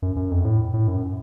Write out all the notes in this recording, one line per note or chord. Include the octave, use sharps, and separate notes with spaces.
F#2
F#2
F2
A2
A2
F#2